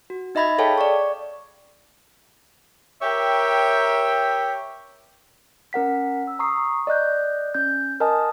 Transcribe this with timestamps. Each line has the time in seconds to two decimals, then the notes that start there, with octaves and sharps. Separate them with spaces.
0.10 F#4
0.35 D#4 D#5 E5 B5 G#6 A6
0.58 G#4 A4 C#5 F5 G5 A5
0.78 D5 C#6
3.02 G4 A#4 C#5 E5 G5
5.73 C#4 A#4 F#5 B6
6.27 E6
6.39 A#5 C#6 D#6 C7
6.87 D5 D#5 F#6 G6
7.54 C#4 G6
8.00 A#4 D#5 G#5 A5 D#6